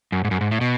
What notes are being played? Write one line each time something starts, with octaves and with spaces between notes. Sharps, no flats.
F#2
G#2
F#2
G#2
A2
B2